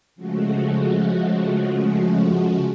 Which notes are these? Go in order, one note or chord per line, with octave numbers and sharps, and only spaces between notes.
C#3 F3 G#3 A3 F#4